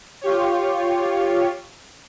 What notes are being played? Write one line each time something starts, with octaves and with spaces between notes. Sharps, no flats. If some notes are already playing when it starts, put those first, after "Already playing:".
F4 G4 C#5